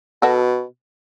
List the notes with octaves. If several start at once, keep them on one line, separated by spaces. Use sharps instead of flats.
B2 F#4 A4